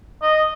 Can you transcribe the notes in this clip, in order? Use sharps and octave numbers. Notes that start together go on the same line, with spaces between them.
D#5